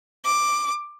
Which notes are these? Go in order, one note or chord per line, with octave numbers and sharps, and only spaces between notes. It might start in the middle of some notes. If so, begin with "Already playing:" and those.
D6